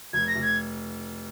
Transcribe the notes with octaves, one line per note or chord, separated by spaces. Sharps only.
F1 G#6
A#6
F1
G#6